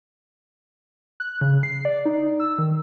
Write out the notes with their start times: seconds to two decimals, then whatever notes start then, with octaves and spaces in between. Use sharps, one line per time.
1.20 F#6
1.41 C#3
1.63 C7
1.85 D5
2.05 D#4
2.40 E6
2.58 D#3